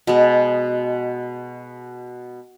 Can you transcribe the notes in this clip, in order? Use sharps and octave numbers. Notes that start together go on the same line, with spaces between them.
B2 G#3